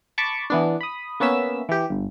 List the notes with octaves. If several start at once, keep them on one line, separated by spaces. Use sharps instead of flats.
A5 B5 C#6 D6
E3 B3 D4
B5 D#6
A#3 B3 C#4 E5 E6
E3 G4
G1